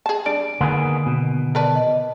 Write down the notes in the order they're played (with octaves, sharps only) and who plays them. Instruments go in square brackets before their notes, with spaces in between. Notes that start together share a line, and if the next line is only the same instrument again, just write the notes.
[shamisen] G#4 A5
[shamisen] G3 D4 D5 [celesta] D7
[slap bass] D3 D#3 [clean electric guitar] A#3 B3 G#4
[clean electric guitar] B2
[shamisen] A#4 B4 D5 [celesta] A5
[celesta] D#5